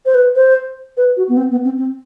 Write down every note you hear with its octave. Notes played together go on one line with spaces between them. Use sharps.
C5
B4
C5
B4
F#4
B3
C4
B3
C4
C4